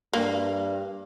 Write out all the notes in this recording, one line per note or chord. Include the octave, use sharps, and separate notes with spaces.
G2 A#3